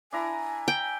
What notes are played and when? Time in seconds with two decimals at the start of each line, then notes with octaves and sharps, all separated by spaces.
0.12 D4 E4 G#5 A#5
0.68 G5